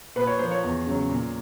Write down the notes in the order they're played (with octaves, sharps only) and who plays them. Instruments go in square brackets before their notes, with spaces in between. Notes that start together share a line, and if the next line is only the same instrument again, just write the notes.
[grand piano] A#2 B4
C#5
F3 A#3 C5
C#5
E2
C#3 F#3
A#2